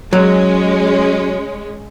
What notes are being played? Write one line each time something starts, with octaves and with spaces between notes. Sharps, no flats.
F#3 G#3 C#4